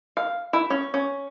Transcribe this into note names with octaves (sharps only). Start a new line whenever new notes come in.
F5
E4
C#4
C#4